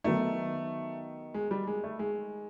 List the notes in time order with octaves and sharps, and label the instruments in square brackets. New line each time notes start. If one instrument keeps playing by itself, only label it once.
[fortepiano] D#3 F#3 B3 D#4 [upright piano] A3
[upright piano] G#3
G3
G#3
A3
G#3